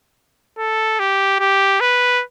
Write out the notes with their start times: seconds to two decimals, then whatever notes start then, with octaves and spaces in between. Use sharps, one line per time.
0.58 A4
0.99 G4
1.40 G4
1.81 B4